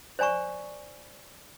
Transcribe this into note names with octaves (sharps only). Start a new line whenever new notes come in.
C5 D5 G#5 A#5 C#6